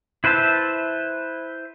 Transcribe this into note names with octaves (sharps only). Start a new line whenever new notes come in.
E4 B4 C5 E5 A5